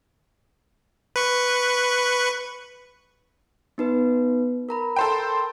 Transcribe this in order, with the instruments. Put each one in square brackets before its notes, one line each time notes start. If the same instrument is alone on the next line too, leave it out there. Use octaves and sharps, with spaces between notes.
[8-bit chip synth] B4 C#6
[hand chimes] B3 D#4 B4
A#4 A#5 B5
[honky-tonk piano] A4 C5 G5